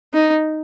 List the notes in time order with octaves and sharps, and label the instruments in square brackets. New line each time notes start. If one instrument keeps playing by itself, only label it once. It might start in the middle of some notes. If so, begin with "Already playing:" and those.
[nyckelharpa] D#4